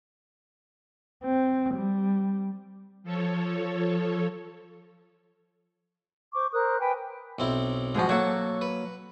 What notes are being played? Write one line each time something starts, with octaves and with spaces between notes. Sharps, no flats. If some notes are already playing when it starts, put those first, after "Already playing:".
C4
G3
F3 A4 C#5
C5 C#6 D6
A#4 C5 D#6 F#6
B4 G5 G#5
B1 C4 E4
G#2 F3 G3 G#3 F#4
F#3 A#3 A4 F#5 C#6
B4